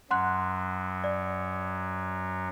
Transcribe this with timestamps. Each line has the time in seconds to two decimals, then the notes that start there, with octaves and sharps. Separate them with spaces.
0.11 F#2 F#3 F#5 C6 F#6
1.04 D5